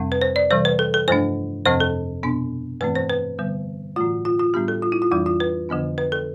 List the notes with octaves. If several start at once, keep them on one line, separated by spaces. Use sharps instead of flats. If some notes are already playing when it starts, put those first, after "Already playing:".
Already playing: F2 C3 G3 C4
B4
C5
D5
C3 E3 G3 C5
B4
A4
A4
G2 F3 A3 D4 C5
F2 C3 F3 C4 C5
A4
B2 B3 D4
G2 E3 A3 C4 B4
C5
B4
D3 G3 B3
A2 E3 A3 F4
F4
F4
A2 G3 B3 D4 G4
A4
F4
E4
F4
F2 E3 G3 D4 E4
F4
B4
F2 D3 F3 B3 D4
B4
A4